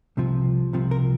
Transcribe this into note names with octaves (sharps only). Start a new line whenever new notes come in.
C2 C3 F3
C2 C3 F3
A#4